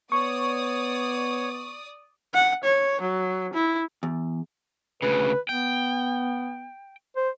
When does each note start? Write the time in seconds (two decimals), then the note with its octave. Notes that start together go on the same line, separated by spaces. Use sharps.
0.12 B3 C#5 D5 C#6 D#6
2.34 F#5
2.64 C#5
3.01 F#3
3.53 E4
4.03 E2
5.02 D2 C#3 B4
5.49 B3 G5
7.17 C5